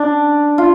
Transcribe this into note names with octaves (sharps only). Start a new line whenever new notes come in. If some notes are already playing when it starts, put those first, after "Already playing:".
Already playing: D4
F4